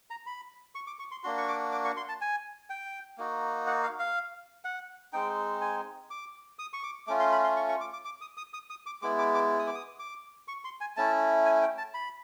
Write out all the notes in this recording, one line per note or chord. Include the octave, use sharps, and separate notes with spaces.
A#5
B5
C#6
D6
C#6
C6
A#3 D4 F#4 C6
C#6
D6
D6
C#6
C6
A5
G#5
G5
A#3 D#4 F#4
F#5
F5
F5
F#5
G#3 C4 D#4 G5
G#5
D6
D#6
C#6
D6
A3 C#4 F4 D6
C6
B5
C6
C#6
C#6
D6
D6
D6
D#6
D#6
D#6
D#6
D6
G#3 B3 E4 D6
D6
D6
D#6
D6
D#6
D6
C#6
C6
G#5
A3 C#4 E4 A5
G#5
G5
A5
B5